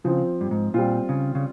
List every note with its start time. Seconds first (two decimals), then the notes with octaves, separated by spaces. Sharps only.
0.05 C#3 F3 C4 F4
0.41 G2
0.51 G#2
0.74 A#2 G3 C4 F4
1.09 C#3
1.35 C#3